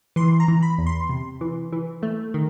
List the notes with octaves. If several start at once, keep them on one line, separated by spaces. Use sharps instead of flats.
E3 C6
A#5
E3
B5
E2
C6
C3
E3
E3
A3
D#3